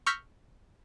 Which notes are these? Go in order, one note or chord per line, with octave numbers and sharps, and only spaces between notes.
C#6 E6 F6 G6 A#6 B6